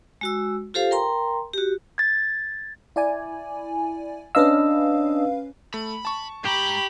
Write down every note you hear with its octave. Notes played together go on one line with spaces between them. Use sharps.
G#3 F#4 E6
F4 G4 A4 C5 F5
A#4 G5 A#5 C6
F#4 G4
G#6 A6
E4 D5 G#5
C#4 D4 B4 D#5 F5 E6
A3 B5
A5 C#6
G#2 G4 A#5 B5